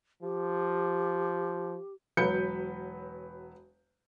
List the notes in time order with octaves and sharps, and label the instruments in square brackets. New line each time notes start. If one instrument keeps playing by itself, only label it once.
[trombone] F3 [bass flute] G4
[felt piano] E1 F#3 B4 B5 G6 C#7